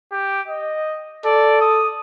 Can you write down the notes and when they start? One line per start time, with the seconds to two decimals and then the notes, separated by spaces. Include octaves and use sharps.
0.12 G4
0.48 D#5
1.25 A4 D5
1.61 D#6